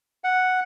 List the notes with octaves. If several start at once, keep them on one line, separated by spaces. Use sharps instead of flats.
F#5